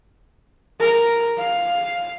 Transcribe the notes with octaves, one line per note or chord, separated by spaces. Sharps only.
A#4
F5